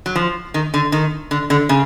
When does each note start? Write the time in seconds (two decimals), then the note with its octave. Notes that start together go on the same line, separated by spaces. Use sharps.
0.06 F#3
0.16 F3
0.54 D#3
0.74 D3
0.92 D#3
1.31 D3
1.50 D3
1.69 C#3